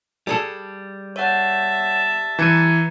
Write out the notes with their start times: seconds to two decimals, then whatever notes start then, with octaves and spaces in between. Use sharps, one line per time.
0.27 G3 G#4 A4
1.16 C#5 E5 F#5 A5
2.39 E3 A#5 G#6 C#7 D#7